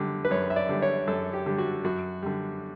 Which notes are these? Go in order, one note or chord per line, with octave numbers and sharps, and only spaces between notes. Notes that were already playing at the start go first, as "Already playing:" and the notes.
Already playing: F#2 D3 G3
B4
F#2 C#5
E5
D5
D3 G3
C#5
F#2 A4
G4
D3 G3
F#4
F#2 F#4
D3 G3